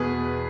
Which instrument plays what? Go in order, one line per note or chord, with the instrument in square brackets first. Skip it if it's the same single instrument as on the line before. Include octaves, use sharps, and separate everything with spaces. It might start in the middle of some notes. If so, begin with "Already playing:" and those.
Already playing: [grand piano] E2 B2 G#4 B4